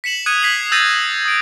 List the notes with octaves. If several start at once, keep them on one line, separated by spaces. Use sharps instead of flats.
B6 C#7 E7 F#7
D#6 F#6 G#6 C#7 D#7
G#6 B6 C7 F#7
E6 G6 A6 A#6 D#7
D#6 D7